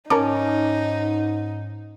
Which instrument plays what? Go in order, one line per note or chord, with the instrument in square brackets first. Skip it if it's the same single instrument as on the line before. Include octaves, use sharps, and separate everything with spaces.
[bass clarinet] G#2 [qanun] C#4 [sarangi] D#4 [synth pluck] A#4 A5 D6